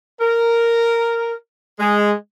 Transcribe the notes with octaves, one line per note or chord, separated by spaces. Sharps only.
A#4
G#3